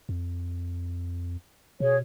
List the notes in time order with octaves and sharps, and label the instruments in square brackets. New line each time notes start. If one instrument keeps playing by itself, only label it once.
[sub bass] F2
[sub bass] B2 [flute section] G#4 C#5